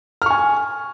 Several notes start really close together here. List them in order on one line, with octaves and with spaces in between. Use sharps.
F6 C#6 G#5